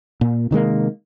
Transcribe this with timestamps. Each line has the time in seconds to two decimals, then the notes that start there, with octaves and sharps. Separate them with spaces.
0.21 A#2
0.51 C3 D#3 G#3 A#3